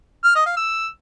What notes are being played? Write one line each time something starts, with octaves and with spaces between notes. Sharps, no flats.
F6
D#5
F5
E6